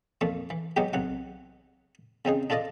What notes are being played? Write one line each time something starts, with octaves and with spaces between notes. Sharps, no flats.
F2 A#2 F3 A3
E3
B2 F#3 G#3 D#4 G4
B1 C3 F#5
C#3 C4 D#4 G#4
D4 F4 A4 D5 D#5